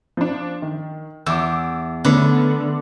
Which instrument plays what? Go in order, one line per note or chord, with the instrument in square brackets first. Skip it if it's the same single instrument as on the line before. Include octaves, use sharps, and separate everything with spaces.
[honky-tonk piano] F3 D4
D#3
[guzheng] E2 [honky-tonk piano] D6 E6
[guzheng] D3 [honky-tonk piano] A3 B3 C#4